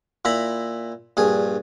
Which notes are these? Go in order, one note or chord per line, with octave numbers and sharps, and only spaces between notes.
A#2 E4 A#5 B5
A#1 G2 G#4